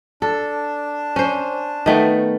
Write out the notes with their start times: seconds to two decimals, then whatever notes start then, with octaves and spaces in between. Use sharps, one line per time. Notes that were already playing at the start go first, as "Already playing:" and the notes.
0.22 D4 A4
1.16 C#4 C5
1.86 D#3 A3 B3